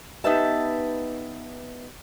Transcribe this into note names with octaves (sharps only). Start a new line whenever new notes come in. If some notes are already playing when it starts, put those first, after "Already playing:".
B3 D#4 G4 B4 E5 A5